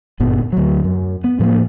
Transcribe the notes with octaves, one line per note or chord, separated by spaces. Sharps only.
G1 F#2 A#2 B3
D2 F#3
F#2
B3
A2 F3 F#3 A#3